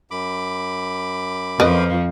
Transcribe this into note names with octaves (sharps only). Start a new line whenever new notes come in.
F#2 B5 D6
F2 F3 A#4 B4 D#5